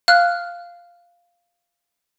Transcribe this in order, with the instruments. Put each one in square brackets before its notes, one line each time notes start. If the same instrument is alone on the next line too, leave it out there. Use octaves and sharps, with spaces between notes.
[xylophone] F5 F6 F#6